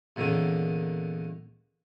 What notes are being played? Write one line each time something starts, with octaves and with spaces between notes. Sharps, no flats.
E2 A#2 D3 D#3 C#4